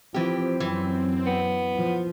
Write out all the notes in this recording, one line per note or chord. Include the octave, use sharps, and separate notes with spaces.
E3 F3 C4 G4
F#2 E3
B3
F3